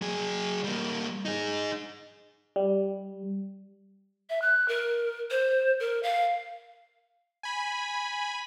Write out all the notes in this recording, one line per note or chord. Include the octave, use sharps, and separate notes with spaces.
F#3 G#4
G3 A#3
D#4 G#4
G3
E5
F#6
A#4
C5
A#4
F5
G#5 B5